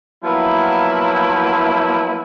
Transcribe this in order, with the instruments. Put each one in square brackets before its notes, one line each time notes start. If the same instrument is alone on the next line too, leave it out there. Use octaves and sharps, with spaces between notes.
[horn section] F3 F#3 A#3 B3 E4